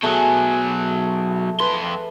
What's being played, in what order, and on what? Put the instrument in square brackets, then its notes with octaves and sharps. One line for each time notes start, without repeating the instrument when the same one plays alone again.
[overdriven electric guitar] B2 F#3 [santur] A3 G#4
[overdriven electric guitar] F2 C6 [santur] B4